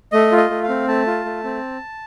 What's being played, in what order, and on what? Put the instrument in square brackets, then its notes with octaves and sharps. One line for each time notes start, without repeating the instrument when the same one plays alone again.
[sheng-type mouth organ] A3 D#5
F4
D#5
A3
F5
C4
A3 A5
F4
A3
C4